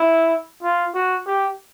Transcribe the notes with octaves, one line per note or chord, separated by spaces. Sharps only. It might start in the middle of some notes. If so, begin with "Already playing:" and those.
Already playing: E4
F4
F#4
G4